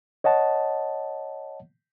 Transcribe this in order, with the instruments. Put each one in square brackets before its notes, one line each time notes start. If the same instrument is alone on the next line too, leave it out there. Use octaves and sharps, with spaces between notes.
[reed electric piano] C#5 D#5 F#5 A5